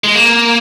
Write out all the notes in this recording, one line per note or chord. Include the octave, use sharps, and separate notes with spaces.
G#3
A#3